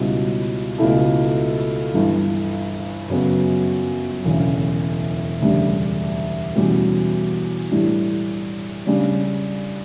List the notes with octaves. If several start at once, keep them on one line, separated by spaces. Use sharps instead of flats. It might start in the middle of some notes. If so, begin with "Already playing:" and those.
Already playing: C#2 B2 G3 C#4 E4
C#2 B2 A3 E4 A4
G1 G2 E3
F#2 C#3 F#3 B3
E1 D2 C#3
E1 D2 C#3 G3 D4
E2 B2 G3 C#4 G4
A2 E3 G3 D4
C#3 G3 D4